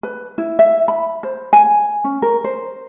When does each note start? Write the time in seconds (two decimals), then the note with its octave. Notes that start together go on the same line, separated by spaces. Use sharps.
0.03 B4
0.38 E4
0.59 E5
0.88 B5
1.23 C5
1.53 G#5
2.04 C#4
2.22 A#4
2.44 C5